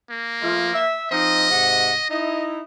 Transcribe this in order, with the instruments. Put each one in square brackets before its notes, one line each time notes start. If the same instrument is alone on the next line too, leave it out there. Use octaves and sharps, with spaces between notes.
[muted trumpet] A#3
[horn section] F3 A3 F4
E5
[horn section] F3 C4 D#4 [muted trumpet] D#5
[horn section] G#2 C3 F#5
[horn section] D#4 E4 [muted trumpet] D#5